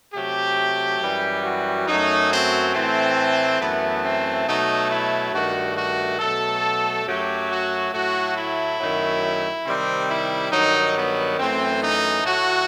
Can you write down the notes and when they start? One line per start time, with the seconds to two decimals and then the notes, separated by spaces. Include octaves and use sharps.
0.13 C3 F#3 A3 G4
1.01 F#2 E3 G3
1.43 F#4
1.87 F#2 F#3 A3 D#4
2.30 C4
2.74 A2 E3 A3 C4
3.60 F#2 E3 A3 B3
4.04 C4
4.47 B2 F#3 A3 D#4
4.90 E4
5.33 G2 D#3 A3 F#4
5.76 F#4
6.19 B2 F#3 A3 A4
7.05 F#2 F#3 A3 G4
7.49 F#4
7.92 A2 F#3 A3 F#4
8.36 E4
8.79 F#2 D#3 F#3 A3
9.65 C3 D#3 G3 C4
10.09 E4
10.52 G2 D#3 F#3 D#4
10.95 B3
11.38 F#2 E3 A3 C4
11.82 D#4
12.24 A2 F#3 A3 F#4